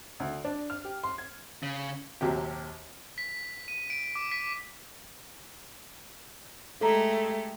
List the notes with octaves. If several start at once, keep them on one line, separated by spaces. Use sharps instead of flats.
D2
D4
F6
G4
C6
G#6
C#3
A#1 D#2 C3 F#3 G4
B6
D#7
D7
D6
B6
G#3 A3 G4 A4 A#5